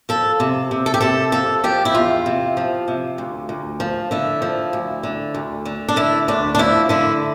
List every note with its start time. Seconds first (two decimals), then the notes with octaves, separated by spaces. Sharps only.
0.09 F3 A4
0.40 C3
0.71 C3
0.86 A4
0.94 G4
1.01 C3 A4
1.32 F3 A4
1.64 F3 G4
1.85 E4
1.94 E2 F4
2.26 C3
2.57 F3
2.88 C3
3.18 D2
3.49 D2
3.80 F3
4.11 D3 E4
4.42 F3
4.73 D2
5.03 D3
5.34 D2
5.65 D3
5.88 D4
5.96 D3 E4
6.28 D2 D4
6.55 D4
6.59 F3 E4
6.89 D3 E4